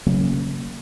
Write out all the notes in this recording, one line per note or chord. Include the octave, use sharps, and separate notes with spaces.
C#3 F#3 A#3 C#4